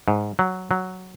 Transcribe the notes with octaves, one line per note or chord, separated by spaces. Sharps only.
G#2
F#3
F#3